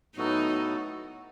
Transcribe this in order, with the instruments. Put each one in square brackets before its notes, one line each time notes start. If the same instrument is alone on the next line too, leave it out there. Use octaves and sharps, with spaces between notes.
[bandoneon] A2 F#3 B3 F#4 A4 [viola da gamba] D#4